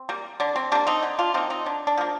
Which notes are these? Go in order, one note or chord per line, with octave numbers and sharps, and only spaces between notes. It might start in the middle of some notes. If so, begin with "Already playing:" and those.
Already playing: C4
G3 A#3
D3 D4
C4
G3 A#3 D4
C4 D#4
D3
D4 F4
F3 A#3 C4 D#4
C4 D#4
D3 D4
D4
F3 A#3